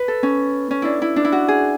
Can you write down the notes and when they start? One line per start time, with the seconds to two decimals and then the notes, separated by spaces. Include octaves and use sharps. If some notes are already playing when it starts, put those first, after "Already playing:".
Already playing: B4
0.08 A4
0.23 C#4
0.71 C#4
0.82 D4 E4
1.02 E4
1.16 D4
1.24 E4
1.32 F#4
1.48 G#4